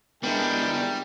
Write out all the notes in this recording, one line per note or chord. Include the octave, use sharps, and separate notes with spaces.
G3 G#3 B3 D4 E4 A#4 G5